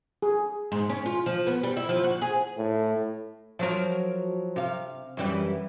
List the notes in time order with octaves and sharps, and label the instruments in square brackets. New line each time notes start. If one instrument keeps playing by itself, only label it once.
[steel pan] G#4
[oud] G#2
C#4
F4
F3
B3
G3
E4
F3
F#4
G#4
[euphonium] A2
[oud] F3 F#3 A#4
C3 F5
F#2 E3 G3